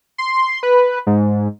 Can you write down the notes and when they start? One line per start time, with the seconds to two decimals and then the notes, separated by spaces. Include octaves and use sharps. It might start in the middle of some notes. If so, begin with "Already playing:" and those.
0.18 C6
0.63 B4
1.07 G#2